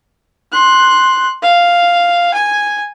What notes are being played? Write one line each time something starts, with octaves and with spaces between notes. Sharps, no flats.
C6 F#6
F5
G#5